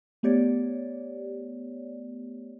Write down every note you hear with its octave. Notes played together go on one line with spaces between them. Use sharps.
A3 B3 G4 C#5 D5